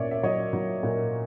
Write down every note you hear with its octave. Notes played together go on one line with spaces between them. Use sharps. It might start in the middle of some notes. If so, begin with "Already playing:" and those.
Already playing: A#2 C#4 C#5 D5 E5
E5
F#3 C#5 D#5
F#3
A#2